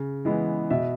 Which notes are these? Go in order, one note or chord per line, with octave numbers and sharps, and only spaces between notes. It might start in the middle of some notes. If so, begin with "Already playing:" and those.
Already playing: C#3
E3 G#3 B3
B2 E5